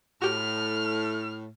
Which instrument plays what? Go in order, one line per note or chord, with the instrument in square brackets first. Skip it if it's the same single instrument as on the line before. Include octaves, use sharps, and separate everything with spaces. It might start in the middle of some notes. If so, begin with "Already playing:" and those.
[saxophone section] A2 [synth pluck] F#4 G4 [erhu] F6